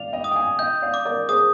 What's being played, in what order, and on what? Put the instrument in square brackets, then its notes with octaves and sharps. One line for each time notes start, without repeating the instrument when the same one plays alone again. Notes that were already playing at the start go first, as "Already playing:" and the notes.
Already playing: [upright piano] D5 F5 [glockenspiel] F7
[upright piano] D#5 G5
[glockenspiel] D#6
[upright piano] G5
F5 G#5
[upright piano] D#5 G5 [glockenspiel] G6
[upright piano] D5 F5
[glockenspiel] D6
[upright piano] A#4 D5
[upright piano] G#4 C5 [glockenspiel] D#6